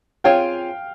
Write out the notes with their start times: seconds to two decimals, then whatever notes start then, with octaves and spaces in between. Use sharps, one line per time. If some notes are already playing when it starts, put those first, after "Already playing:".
0.24 C4 F4 G#4 C#5 F5 G5